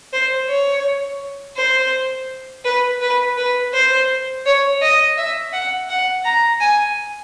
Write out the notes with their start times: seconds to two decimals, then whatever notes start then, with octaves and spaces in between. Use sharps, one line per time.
0.13 C5
0.49 C#5
1.57 C5
2.65 B4
3.01 B4
3.37 B4
3.74 C5
4.46 C#5
4.82 D#5
5.17 E5
5.53 F#5
5.90 F#5
6.25 A#5
6.61 G#5